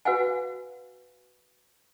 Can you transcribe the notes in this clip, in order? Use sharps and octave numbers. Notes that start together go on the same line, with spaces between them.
F#4 B4 F5 F#5 G#5